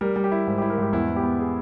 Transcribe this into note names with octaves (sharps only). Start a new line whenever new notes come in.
G3 A#4
G3
G4
E4
G#2
E4 G4
A#4
G#2 G4
E2 E4
B3
G4
B3
G#4